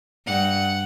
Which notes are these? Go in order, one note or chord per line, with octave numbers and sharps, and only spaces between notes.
G2 F#5